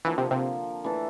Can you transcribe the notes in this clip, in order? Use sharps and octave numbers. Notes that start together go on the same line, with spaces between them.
D3 E3 F3 A#3
C3
C3
E3 A3 D4 A4